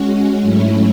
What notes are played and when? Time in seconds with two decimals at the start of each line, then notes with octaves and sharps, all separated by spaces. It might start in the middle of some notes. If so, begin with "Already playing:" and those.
Already playing: G#3 C#4 F#4
0.42 G#2 F#3 A3 C#4 E4